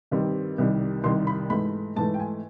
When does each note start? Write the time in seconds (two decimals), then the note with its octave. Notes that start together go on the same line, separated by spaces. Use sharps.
0.11 G2 D#3 G3 C4
0.58 C2 C3 D#3 G3
1.04 C2 C3 D#3 G3 C6
1.27 B5
1.50 G#2 E3 A3 B5
1.96 G#2 E3 A3 A5
2.14 G5
2.20 G#5